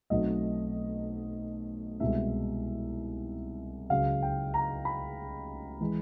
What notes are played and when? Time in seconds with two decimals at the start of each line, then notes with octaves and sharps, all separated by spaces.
0.10 B1 B2 F#3 A3 C4 D#5
2.00 C2 B2 G#3 E5
3.90 C#2 C#3 F#3 F5
4.22 G5
4.54 A#5
4.85 B5
5.81 E3 G#3